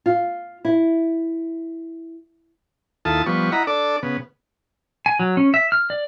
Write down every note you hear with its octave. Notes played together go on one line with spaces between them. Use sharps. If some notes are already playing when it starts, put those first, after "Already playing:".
F4
E4
D#2 E4 F4 A4 A5 D#6
F3 G3 B3 C#6
E4 D#5 F#5 A#5 B5
D4 A4 D5 D6
C#3 B3
G#5
F#3
C#4
E5
F6
D5